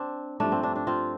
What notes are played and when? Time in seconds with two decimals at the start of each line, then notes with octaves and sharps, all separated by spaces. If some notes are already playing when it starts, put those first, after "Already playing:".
Already playing: C4 D4
0.40 G2 F3 A3 D4
0.52 C4
0.63 D4
0.75 D4
0.87 C4 F4